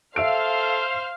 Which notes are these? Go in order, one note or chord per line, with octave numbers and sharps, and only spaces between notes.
A4 C5 E5 F5 E6 F6 D7